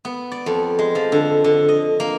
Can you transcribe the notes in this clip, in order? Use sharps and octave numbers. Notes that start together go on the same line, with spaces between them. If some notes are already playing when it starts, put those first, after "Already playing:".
B3
D5
F2
G#3
F3
D3
D3
D#5
A#3